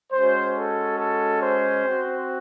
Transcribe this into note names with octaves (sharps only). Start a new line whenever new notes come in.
G#3 C#4 F#4 C5
A4
A4
C5
C4 F#4